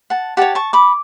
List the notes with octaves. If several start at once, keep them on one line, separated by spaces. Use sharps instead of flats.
F#5 A5
G4 C#5 F#5 A5
A5 C#6
B5 D6